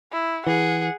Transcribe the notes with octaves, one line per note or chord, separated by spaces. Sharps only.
E4
E3 G#4 F#5